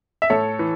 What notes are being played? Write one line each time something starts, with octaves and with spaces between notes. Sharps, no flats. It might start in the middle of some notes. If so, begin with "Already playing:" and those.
E5
A2 A4 C#5
E3